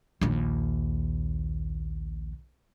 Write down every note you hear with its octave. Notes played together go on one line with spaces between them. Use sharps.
A#1 D#2